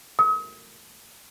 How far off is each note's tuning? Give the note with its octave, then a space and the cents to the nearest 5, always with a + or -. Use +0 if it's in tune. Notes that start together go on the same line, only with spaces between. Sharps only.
D#6 +40